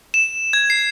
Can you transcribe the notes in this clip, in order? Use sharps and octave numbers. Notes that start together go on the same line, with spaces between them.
E7
G#6
C7